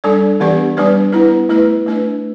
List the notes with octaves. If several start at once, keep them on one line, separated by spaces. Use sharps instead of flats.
G3 D4 A4 D5
E3 B3 D4 G4 D5
G3 D4 B4 D5
B3 E4 B4
A3 E4 B4
A3 D4 B4